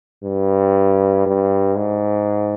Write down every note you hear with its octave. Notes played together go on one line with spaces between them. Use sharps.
G2
G2
G#2